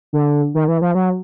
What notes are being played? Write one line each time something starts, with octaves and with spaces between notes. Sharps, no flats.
D3
D#3
E3
F3
F#3